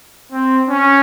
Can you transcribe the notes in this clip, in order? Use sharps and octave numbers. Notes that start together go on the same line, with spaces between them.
C4
C#4